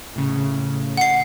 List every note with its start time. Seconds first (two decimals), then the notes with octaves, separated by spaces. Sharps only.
0.16 A2 C#3
0.97 F#5 C7